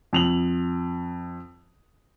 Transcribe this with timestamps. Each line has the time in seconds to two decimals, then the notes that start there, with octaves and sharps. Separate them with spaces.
0.13 F2 F7 F#7